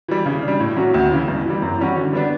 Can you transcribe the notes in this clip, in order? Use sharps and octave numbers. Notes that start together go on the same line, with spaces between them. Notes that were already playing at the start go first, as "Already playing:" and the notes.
E3 G3
C#3
D4
G3
A2
F#3 C#4 F#4
D2
C#3 E3
G2
E3 G3
F#2
E3 G3 C#4 F#4
D3
G3 B3 D4